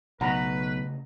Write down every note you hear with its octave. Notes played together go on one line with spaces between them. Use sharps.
B1 C#3 A3 B4 D#5 F#5 A#5 B5